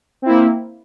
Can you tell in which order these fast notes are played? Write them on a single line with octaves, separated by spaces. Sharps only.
C4 E4 A#3